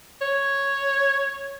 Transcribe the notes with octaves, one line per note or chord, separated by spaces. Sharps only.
C#5